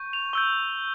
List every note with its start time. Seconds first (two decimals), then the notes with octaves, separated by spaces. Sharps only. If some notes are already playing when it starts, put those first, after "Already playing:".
Already playing: C#6 G6
0.13 F7
0.33 C#6 E6 G6 G7